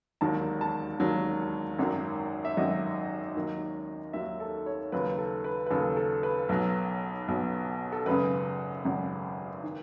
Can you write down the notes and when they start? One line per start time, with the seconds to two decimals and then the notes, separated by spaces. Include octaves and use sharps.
0.21 E1 D#2 D#3 F#3 A5
0.61 A5
1.00 E1 D#2 D#3 F#3
1.78 G#1 F#2 D#3 F#3
2.45 E5
2.57 G#1 F#2 D#3 F#3 D#5
3.35 D#2 D#3 F#3
4.13 D#2 D#3 F#3 E5
4.40 A4
4.66 C#5
4.92 D#2 C#3 F#3 B4
5.18 A4
5.44 B4
5.66 B4
5.71 D#2 C#3 F#3 A4
5.97 A4
6.23 B4
6.49 B1 B2 F#3
7.28 B1 B2 F#3
7.92 A4
8.06 G#1 F#2 C#3 B4
8.85 G#1 F#2 C#3
9.64 D#3